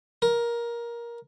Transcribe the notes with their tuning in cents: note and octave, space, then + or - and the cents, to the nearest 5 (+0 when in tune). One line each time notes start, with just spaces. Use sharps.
A#4 +15